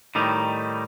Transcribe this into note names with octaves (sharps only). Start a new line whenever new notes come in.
A2 D#3 G3 D#4